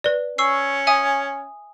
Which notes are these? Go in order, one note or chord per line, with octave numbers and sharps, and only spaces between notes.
B4 D5
C#4 C#6 E6 C7
E5 G#5 D#6